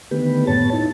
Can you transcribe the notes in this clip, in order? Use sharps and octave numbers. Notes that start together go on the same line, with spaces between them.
D3 D#3 A3 B3 G4 B4
F#2 A2 B3 C#5 A5 A6
D#4 E4